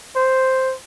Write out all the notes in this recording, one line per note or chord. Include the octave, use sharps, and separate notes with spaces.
C5